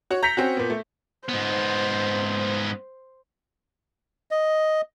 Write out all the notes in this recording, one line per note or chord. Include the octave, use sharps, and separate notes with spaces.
F#4 C#5
A#5 G6 A#6 B6 C#7 F7
C4 C#4 F#4
A#2 B3
A3
G#2 B3 C5
D#5